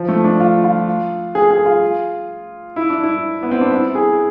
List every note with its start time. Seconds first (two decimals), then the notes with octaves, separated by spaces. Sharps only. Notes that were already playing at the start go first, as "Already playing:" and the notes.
Already playing: F3
0.09 A3
0.24 D4
0.40 F4
0.64 F4
1.35 G#4
1.51 G#4
1.66 F4
2.76 E4
2.90 D4
3.04 E4
3.43 B3
3.51 C4
3.61 D4
3.72 E4
3.95 G#4